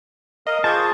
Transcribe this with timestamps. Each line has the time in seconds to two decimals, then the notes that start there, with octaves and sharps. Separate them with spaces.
0.47 A#4 D#5 F5
0.64 F4 G#4 C5 A5 C#6 D6 G#6